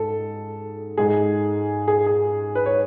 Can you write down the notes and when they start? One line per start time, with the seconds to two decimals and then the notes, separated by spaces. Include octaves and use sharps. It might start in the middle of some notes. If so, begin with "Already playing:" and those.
Already playing: G#2 G#3 A4
0.97 G#2 G#3 G#4
1.88 G#4
2.06 G#4
2.55 B4
2.66 C#5